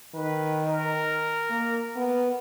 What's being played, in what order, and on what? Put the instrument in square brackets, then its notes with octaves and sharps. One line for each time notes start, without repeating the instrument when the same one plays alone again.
[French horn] D#3 [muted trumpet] B4
[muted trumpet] A#4
[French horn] A#3
B3